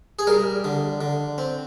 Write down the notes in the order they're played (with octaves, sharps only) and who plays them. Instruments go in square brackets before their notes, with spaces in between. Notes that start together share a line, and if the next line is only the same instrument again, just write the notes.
[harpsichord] G#4
G3 A#4
D3
D3
C4